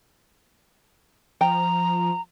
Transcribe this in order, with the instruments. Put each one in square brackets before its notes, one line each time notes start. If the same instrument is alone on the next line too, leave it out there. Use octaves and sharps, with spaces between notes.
[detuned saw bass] F3 [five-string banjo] G5 [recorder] A#5